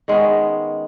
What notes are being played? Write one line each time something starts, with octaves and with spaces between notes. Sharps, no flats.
D#3 G#3 B3 C#4